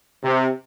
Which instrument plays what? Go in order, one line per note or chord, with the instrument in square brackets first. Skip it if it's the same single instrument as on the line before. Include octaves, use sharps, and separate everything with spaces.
[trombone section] C3